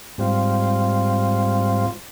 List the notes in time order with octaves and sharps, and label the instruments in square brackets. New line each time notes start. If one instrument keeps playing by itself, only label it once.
[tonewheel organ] G#2 G3 C4 F4